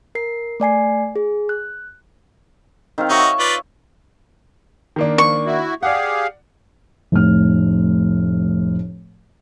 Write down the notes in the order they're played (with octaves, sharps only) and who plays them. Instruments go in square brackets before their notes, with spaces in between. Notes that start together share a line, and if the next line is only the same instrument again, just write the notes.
[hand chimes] A#4 C7
A3 D5 G#5 C7
G#4
F#6
[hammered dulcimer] D#3 C4 F5
[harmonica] D#4 F#4 [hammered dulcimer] C#5 E5 C#6
[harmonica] F4 B4 D5
[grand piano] D#3 A#3 D4
[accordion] F3 [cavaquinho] C#6
[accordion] E4 F#4
[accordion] G4 G#4 F5 [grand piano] D5 F#5
[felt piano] F1 A2 F6